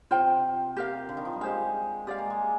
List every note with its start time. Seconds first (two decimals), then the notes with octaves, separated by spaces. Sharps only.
0.11 C3 F4 C5 G5
0.77 G4 A#4 F5
1.09 D3
1.17 D#3
1.25 F3
1.33 G3
1.41 G#3 G4 C5 F5
2.07 G#3 G4 D5 F5
2.18 A#3
2.30 G#3